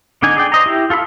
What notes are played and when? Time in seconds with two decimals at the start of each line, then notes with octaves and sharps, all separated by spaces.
0.22 D3 D4 D#4 G#5
0.36 G#4 D5 G5
0.52 C5 D#5 A#5
0.66 E4 G4
0.90 F4 A4 F5 B5 E6